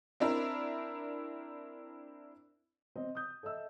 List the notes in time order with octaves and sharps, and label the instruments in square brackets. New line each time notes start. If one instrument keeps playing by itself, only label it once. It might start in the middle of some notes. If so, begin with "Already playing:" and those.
[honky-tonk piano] C4 D4 E4 A#4
[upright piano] C4 D#5
D#6 G6
A4 D#5 E5 E6